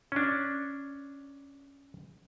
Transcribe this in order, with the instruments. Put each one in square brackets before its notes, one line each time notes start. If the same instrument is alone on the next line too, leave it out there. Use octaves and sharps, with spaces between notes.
[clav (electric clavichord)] C#4 D4